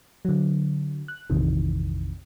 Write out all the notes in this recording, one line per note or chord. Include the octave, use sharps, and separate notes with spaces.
D3 F#3
F#6
A#1 F2 C3 D#3 E3